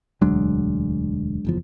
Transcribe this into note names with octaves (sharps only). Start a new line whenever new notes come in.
E1 D2 F#3 G#3 D4
F#1 E2 F3